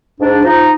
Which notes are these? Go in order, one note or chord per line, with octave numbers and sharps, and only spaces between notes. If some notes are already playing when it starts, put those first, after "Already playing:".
G#2 D4
F3 D#4